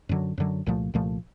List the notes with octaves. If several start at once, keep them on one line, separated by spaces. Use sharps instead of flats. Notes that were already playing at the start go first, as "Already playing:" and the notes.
F#2 D3 F#3
F#2 D3 F#3
C2 A#2 F3 A3
C2 A#2 F3 A3